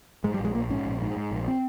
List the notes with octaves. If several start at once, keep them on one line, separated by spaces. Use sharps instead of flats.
G#2 G#3
G3
A#1
G#3
A#1 A#3
G#2 C#4
A#1
G#2
G#2
A#1
C4